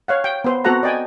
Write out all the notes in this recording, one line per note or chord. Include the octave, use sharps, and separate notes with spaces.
C#5 F5 F#5
G5
B3 C5
B3 C4 F#4 A4 F#5 A#5
D5 D#5 G5 G#5